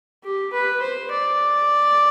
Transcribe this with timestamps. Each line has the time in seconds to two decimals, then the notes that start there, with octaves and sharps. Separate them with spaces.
0.24 G4
0.53 B4
0.82 C5
1.12 D5